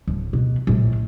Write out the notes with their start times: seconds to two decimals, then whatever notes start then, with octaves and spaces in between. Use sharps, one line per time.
0.08 D1
0.33 B2
0.67 A#1 A2